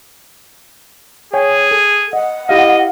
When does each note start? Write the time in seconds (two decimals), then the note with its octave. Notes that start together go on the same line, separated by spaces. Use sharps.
1.34 G#4 C#5 G5 G#5
1.71 A4
2.13 D#5 F#5
2.49 E4 G4 D#5 F5